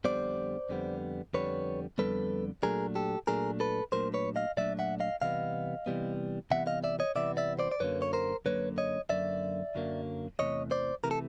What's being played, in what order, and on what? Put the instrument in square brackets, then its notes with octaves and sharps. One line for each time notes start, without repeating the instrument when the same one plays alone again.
[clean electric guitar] F2 D3 G3 B3 C5 D5
F2 D3 G3 B3
F2 D3 G3 B3 B4 C#5
F2 D3 G3 B3 A4 B4
A#2 F#3 A3 D4 G#4 A#4
G4 A4
A#2 F#3 A3 D4 G#4 A#4
A4 B4
A#2 F#3 A3 D4 A#4 C5
B4 C#5
D#5 F5
A#2 F#3 A3 D4 D5 E5
E5 F#5
D#5 F5
C3 E3 G3 B3 D#5 F5
C3 E3 G3 B3
C3 E3 G3 B3 E5 F#5
D#5 F5
D5 E5
C#5 D#5
C3 E3 G3 B3 D5 E5
D5 E5
C5 D5
D5
F#2 D3 F#3 A#3 B4 C#5
C#5
A#4 C5
F#2 D3 F#3 A#3 B4 C#5
C#5 D#5
F#2 D3 F#3 A#3 D5 E5
F#2 D3 F#3 A#3
E2 C3 E3 A3 C#5 D#5
C5 D5
C3 E3 A3 A#4
A4